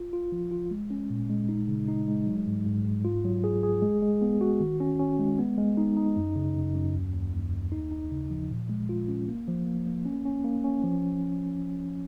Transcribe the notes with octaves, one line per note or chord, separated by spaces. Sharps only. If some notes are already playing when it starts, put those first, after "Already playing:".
Already playing: F4
F4
F3
F4
G#3
C#4
A#2
G#3
D#4
C#3
D#4
G#3
F#3
G#2
G#2
G#2
F4
F#3
G#4
G#4
G#3
G#3
B3
F#4
D#3
C#4
C#4
G#3
B3
G#3
D#4
D#4
F#2
C#3
F#2
F#2
D#2
D#2
D#2
D#2
D#4
D#4
C#3
F3
A#2
G#3
F4
C#4
A#3
F3
A#3
A#3
C#4
C#4
A#3
C#4
F3